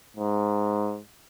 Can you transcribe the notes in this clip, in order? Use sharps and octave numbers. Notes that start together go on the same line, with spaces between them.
G#2